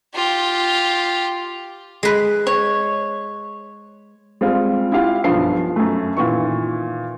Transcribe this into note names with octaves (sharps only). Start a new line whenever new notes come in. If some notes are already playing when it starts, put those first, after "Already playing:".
F4 G4
G#3 B4
C#5
G3 G#3 C4 F4 G#4
E4 F4 G4 F5
B1 G2 F3 C7
F#2 A3
A#2 D#3 E3 C#6